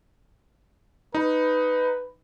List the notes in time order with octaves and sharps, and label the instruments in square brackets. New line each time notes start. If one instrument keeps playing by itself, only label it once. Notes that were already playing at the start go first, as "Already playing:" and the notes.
[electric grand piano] D#4 [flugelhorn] B4